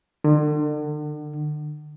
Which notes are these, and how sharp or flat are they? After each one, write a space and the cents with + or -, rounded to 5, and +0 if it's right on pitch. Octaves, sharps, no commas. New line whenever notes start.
D3 +40